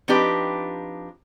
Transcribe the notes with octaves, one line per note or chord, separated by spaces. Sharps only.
F3 C4 D4 D#4 G4 B4